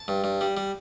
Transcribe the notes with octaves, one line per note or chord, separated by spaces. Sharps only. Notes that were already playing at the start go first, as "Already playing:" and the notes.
Already playing: A5
G2
G2
G3
G3